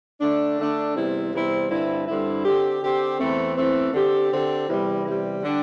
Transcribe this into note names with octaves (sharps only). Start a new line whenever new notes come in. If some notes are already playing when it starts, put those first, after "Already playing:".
D3 A3 D4
D3 A3 D4
E2 C3 G3 C4 E4
E2 C3 G3 C4 E4
G2 D3 C4 E4
G2 D3 C4 E4
D3 C4 G4
D3 C4 G4
E2 E3 A3 C4
E2 E3 A3 C4
D3 C4 G4
D3 C4 G4
E2 C3 G3
E2 C3 G3
D3 G3 D4 G4